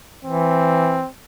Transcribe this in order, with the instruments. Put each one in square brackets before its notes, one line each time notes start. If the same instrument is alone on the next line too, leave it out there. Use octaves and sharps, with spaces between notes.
[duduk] E3 [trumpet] C4